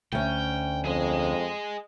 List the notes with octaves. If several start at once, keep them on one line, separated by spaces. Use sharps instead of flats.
D2 C#4 G5
F2 G#4 D#5